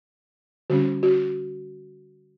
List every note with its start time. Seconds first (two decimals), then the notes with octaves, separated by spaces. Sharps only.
0.70 D3 G3 C#4 F#4
1.03 F#4